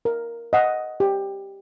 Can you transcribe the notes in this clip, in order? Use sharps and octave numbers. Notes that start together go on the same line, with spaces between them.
A#4
D#5 F#5
G4